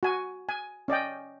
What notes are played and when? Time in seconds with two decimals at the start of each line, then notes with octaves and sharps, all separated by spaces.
0.03 F#4 G#5
0.49 G#5
0.88 C#4 D5 D#5 G5